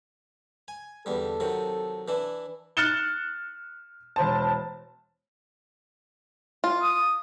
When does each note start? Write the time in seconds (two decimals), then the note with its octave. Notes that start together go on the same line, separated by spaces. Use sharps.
0.68 G#5
1.06 E2 D3 G3 A4
1.40 C3 D#3 F#3
2.08 E3 D4 E4
2.77 F6 F#6 A6 C#7 E7 G7
4.16 E1 C5 A5
6.64 F4
6.82 D#6